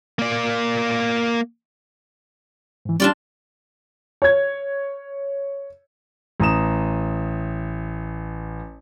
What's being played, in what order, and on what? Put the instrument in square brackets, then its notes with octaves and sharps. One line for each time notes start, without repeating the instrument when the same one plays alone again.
[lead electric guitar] A#3 D5
[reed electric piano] G#2 E3
[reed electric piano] G3 C#4 G4 [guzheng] D4 F4 D5
[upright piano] C#5 G#6
[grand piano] A1 A#5 D#6 E7